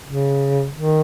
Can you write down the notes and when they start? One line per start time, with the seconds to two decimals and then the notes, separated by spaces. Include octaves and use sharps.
0.07 C#3
0.75 D#3